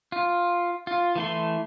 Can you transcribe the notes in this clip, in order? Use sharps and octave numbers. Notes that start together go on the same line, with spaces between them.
F4
F4
E3 A3 C6